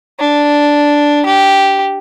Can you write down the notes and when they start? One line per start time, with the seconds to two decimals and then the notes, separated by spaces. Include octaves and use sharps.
0.20 D4
1.26 G4